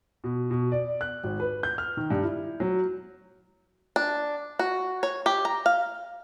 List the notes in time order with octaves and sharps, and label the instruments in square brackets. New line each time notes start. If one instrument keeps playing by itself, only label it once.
[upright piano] B2
B2
D5
F#6
G#1
B4
G6
F6
D#3
G2
E4
F#3
[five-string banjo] D4
F#4
C#5
G4
A#5
F5